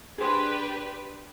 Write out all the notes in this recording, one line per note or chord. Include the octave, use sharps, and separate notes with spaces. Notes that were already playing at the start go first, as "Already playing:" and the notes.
D4 G4 G#4 B4 C5